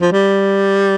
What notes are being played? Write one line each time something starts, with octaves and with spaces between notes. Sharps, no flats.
F3
G3